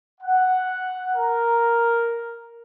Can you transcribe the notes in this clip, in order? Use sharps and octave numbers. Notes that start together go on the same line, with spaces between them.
F#5
A#4